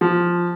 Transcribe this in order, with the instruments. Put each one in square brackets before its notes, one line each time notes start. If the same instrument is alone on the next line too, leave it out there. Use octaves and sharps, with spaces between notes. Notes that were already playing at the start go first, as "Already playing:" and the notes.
[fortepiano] F3